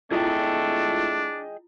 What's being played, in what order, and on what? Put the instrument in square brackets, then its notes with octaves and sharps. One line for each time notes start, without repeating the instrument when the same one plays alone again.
[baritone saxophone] A3 [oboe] D4 [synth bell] E4 F4 [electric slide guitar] G#4 D#5 G5